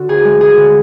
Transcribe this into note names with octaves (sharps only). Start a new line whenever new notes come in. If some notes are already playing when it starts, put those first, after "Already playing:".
Already playing: D3 F#4
D2 G#4
G#3
D3 G#4
D3